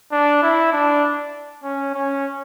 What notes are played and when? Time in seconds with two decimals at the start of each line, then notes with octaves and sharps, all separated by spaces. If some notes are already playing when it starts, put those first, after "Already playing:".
0.12 D4
0.43 E4
0.72 D4
1.63 C#4
1.94 C#4